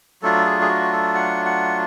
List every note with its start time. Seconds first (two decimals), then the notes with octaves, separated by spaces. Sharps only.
0.22 F#3 A3 D4 F4 A4
0.46 G#4
0.61 G#4
0.68 F#4
0.92 A4
1.15 F#5
1.45 F#5